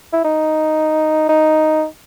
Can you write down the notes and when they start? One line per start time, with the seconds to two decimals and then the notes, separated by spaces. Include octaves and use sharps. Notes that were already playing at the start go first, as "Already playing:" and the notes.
0.13 E4
0.25 D#4
1.29 D#4